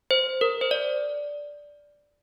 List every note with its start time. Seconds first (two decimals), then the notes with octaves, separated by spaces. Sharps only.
0.11 C5
0.41 A#4
0.61 C5
0.71 D5